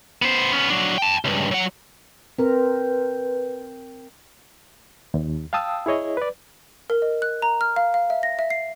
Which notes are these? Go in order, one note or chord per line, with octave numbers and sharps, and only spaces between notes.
B3 C5
B3 C#4
F#3 D4
G5 A5
C#2 G2
F#3 F#5
C4 A#4 B4
D#2
F5 G5 A5 D#6 E6
E4 G#4 C#5 D#5
B4 D5
A#4
D#5
F#6
A#5
F6
F5
F5
E5
A#6
E5
C7